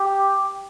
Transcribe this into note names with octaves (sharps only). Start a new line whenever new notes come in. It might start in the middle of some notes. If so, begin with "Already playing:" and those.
Already playing: G4